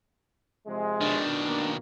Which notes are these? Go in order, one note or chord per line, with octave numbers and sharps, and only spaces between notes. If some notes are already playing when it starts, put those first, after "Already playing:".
C3 F3 G#3
B2 D#3 D4
A#3